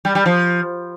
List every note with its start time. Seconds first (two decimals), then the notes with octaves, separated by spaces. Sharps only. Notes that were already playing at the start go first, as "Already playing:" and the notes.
0.05 G3
0.15 G3
0.26 F3